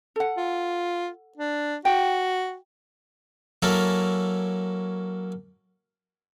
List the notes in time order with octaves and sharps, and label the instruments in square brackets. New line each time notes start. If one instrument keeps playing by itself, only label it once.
[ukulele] A4 F#5
[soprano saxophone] F4
D4
[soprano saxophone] F#4 [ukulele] G5
[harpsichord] F#3 A#3 C#4 E4 A4 A#4